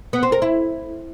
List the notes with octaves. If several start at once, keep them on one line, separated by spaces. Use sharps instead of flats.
B3
C4
A#4
E4